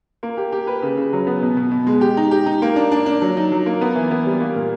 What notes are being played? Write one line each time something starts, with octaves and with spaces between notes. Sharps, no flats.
A#3
G4
G4
B4
C#3
C#3
F#3
B3
B2
B2
B2
G#3
G4
D#4
G4
D#4
A#3
D4
D4
D4
F#3
D#4
F#3
A#3
B3
E3
B3
G3
A#3
A#2